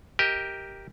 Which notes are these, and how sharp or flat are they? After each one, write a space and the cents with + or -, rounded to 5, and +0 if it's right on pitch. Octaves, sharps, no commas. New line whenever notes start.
G4 +0 A#4 +0 D#5 +25